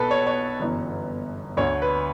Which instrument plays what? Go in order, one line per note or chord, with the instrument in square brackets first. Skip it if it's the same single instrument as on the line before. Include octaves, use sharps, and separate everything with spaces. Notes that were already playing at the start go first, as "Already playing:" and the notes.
Already playing: [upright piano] B1 B2 A4 B4
C#5
C#5
G1 F#2 E3
D2 D3 C#5
B4